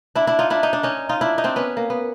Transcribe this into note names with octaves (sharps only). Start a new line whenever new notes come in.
D4 E4
D4 E4
D#4 F4
D4 E4
D#4
D4
C#4 D#4
D#4 F4
D4 E4
D#4
C4 D4
B3 C#4
A#3
B3